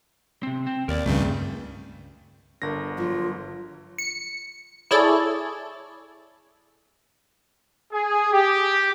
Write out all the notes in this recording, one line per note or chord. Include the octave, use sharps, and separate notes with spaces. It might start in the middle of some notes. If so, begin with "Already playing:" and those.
C3 C4
C4
D#2 A#4 D5
C#2 G2 C#3 A3 C4
G1 D3 A#4 A#6
F3 F#3 F4 C#5
C#7
E4 G#4 A4 C#5 D5
G#4
G4